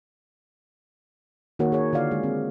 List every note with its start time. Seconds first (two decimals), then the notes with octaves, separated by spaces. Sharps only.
1.59 D#3 A#3 F#4 A#4 C#5
1.72 G#4 A#4 C#5
1.93 D3 F4 D5 F5
2.11 G#3 G#4
2.23 C4